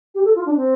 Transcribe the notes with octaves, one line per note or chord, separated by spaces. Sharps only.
G4
A4
F4
D4
C4